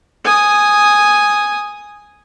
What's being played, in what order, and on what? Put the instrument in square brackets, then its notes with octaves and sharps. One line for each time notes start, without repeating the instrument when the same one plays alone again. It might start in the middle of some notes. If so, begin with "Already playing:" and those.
[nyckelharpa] G#5 D#6